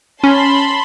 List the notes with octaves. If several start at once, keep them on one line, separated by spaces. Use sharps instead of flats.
C#4 A5 B5 C6